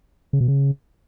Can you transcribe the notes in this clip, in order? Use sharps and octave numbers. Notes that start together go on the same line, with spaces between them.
C#3
B2
C#3